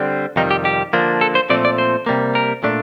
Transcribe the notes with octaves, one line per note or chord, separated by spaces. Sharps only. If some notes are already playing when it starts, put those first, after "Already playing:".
Already playing: D3 G3 C4
F2 C3 D#3 G3 D#4
G4
G4
D3 F3 A#3 D4
A4
C5
A#2 F3 A3 C4 D5
D5
C5
C3 G3 A#3
A#4
A#2 A3 D4